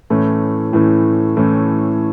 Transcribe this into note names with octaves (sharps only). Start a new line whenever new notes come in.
A2 E3 A3 C#4
A2 E3 A3 C#4
A2 E3 A3 C#4